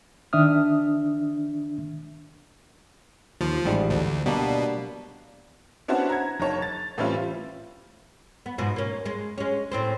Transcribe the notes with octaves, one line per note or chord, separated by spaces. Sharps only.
D#3 D4 E5 D#6 F6
D#2 F3
A1 G#2 G3
D2
B2 G3 A#3 D4
B3 C#4 D4 E4 F#4 C5
A#5 G#6
F#1 D#4 C#5 A5
A6
A2 E3 G3 C4 C#4 F4
B3
G#2 B2 F3
A#3 C#4
G#3
G#3 C#4
A2 C4 C5